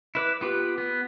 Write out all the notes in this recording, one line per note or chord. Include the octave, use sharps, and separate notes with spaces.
E4 B4 D6
B3 F4 G4 B4
B3